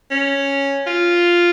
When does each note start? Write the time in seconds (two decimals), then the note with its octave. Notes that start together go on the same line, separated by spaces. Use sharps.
0.11 C#4
0.87 F4